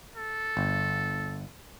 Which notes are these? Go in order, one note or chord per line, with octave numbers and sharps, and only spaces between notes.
A4
G1